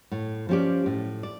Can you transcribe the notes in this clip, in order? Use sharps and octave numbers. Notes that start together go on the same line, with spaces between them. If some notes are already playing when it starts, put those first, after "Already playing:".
A2
F3 C#4 G4 D5
A2
D5